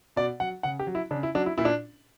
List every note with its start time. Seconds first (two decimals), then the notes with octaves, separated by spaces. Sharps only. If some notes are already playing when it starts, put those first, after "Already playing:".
0.16 B2 D5
0.40 F#3 F#5
0.63 C#3 F#5
0.79 G4
0.87 F#3
0.95 E4
1.11 C#3 D4
1.23 E4
1.35 F#3 D4
1.46 E4
1.58 A#2 E4
1.65 D4